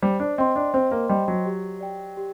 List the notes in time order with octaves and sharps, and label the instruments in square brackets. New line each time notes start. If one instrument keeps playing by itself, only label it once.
[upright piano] G3 [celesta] C5
[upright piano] D4
[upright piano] C4 [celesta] D#5 G5 C6
[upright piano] D4
[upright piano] C4 [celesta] C5
[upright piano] A#3
[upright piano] G3 [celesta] D#5 G5 C6
[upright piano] F#3
[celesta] G4
D5 G5
G4